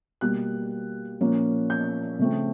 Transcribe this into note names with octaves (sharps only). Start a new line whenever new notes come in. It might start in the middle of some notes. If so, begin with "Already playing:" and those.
B2 G3 A#3 F#6
A#2 F3 A#3 C#4
G6
C#3 F3 A3 C4